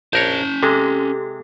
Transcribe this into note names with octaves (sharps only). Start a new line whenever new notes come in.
A#1 C#4 A#4 C#5 A5 G6
C3 G#3 G4 A4